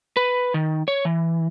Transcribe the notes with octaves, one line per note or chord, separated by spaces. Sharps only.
B4
D#3
C#5
E3